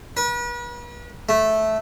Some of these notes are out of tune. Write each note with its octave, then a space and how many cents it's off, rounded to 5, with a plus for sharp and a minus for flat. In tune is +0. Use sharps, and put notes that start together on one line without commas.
B4 -40
A3 -10